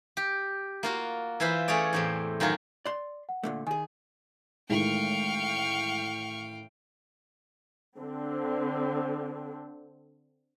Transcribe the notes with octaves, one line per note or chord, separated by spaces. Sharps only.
G4
A#3 F4 F#4
E3 E4 F4 C5 B5
A3 C#4 G#4 C#5 D5
E2 A2 C4
F#2 D#3 F#3 F4 F#4
D5 C6
F#5
A#2 D3 A3
D#3 G#4 G#5
A1 A2 D#3 G#3 F5 G5 C#6 F6
D3 C4